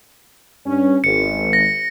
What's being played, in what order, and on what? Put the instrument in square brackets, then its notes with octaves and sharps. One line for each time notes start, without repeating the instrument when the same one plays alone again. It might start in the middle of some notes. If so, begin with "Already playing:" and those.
[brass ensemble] G2 C#4
[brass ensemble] G#1 [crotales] C#7
[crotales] A#6